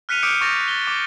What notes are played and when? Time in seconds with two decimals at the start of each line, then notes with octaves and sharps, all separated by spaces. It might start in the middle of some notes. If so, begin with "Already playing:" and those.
0.09 F6 F#6 B6 C#7 D#7 F7
0.23 D6 D#6 F6 G6 C#7 D7
0.41 C#6 D6 G6 A6 A#6 F7
0.68 A6 G7
0.87 D6